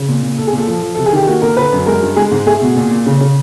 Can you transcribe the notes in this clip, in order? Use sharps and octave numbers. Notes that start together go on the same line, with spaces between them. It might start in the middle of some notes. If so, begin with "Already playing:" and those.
Already playing: C#3
A#2
A#2
A#2 A4
G#4
A#2
A4
F3
F3
C3 A4
G#4
D#3 G4
A#3 F#4
A#2 A#4
D3 B4
F#2
G#3 A#4
G2
G#3 G#4
G#2
A3 G#4
B2
A#2
A#2
C#3
C#3